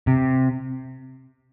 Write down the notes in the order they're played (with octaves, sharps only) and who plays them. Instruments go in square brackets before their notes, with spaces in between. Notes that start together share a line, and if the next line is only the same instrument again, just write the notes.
[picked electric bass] C3